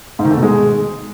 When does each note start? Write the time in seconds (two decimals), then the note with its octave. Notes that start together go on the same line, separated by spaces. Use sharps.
0.19 G#2
0.25 D#3
0.31 A3
0.37 B2
0.43 G#3